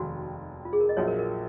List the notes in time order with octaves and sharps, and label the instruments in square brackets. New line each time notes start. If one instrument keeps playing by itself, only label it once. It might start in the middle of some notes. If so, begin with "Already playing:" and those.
Already playing: [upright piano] F1 D#2 D#3 G#3 [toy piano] F#4
[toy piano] F4
G#4
A#4
D#5
[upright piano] A#1 A#2 F#3 [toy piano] C#5
[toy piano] A#4
A#4